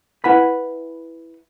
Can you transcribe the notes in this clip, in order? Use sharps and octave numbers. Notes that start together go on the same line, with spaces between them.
E4 B4 F#5 G#5 B5